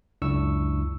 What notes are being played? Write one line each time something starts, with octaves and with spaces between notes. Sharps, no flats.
C#2 F#2 D4 E4 C#6 E6